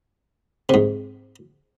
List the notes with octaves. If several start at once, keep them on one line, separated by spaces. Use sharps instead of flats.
G#2 C3